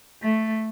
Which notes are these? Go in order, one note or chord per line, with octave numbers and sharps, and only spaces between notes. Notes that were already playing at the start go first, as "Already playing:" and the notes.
A3